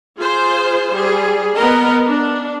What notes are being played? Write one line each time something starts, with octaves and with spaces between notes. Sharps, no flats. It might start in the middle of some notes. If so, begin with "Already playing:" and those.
F4 G#4 C5
G3 G#4
B3 A#4 D#5
D4